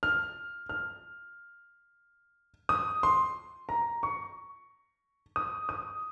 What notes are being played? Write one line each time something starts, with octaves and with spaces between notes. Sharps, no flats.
F6
F6
D#6
C6
A#5
C#6
D#6
D#6